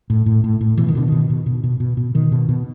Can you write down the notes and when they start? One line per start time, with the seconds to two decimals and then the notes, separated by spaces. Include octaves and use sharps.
0.10 A2
0.26 A2
0.44 A2
0.61 A2
0.78 B2 E3
0.88 D#3
0.95 B2 D3
1.08 B2 D#3
1.30 B2
1.46 B2
1.64 B2
1.80 B2
1.97 B2
2.15 B2 D#3
2.32 B2
2.49 B2